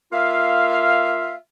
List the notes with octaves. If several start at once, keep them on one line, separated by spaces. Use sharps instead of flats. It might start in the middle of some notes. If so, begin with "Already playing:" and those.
A#3 F4 E5 F5